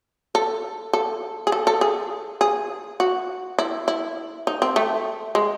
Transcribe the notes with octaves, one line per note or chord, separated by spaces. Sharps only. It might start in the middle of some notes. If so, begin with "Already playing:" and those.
A4
A4
G#4
A4
A4
G#4
G#4
F#4
E4
E4
D#4
C4
A3
G#3